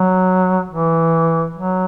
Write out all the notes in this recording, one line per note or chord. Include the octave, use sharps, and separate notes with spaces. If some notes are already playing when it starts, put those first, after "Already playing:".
Already playing: F#3
E3
F#3